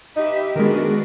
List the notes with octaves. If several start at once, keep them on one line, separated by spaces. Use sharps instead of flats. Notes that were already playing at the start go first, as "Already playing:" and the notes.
D#4 G4 B4 E5
D#3 G#3 B3 D4 F#4 A#4